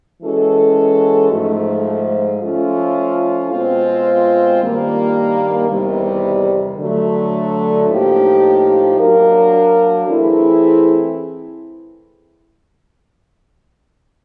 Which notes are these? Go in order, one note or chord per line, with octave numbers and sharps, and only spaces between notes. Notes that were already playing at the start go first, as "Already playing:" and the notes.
E3 G#3 C#4 F#4 A4
G#2 F3 A3
F3 A3 C#4 F4
B2 G#3 C4 F4
G2 D#3 G3 A#3
E2 C3 D#3 G3
D3 F#3 A3
A2 F3 A#3 D#4 G4
F#3 A#3 D4 F#4 A#4
E3 A3 C4 E4 G#4